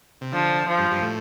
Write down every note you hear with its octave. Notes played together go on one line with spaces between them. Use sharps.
C3
D3 F3
F3
G2
G2
A2